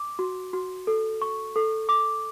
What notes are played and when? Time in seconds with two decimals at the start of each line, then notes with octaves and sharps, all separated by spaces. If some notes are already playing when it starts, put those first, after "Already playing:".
Already playing: D6
0.19 F#4
0.53 F#4
0.87 A4
1.22 C#6
1.56 A4
1.89 D6